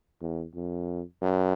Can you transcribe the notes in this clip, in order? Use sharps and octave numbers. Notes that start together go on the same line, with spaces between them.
E2
F2
F#2